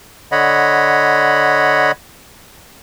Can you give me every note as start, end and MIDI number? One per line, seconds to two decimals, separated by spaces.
0.32 1.91 50
0.32 1.91 73
0.32 1.91 75
0.32 1.91 78
0.32 1.91 83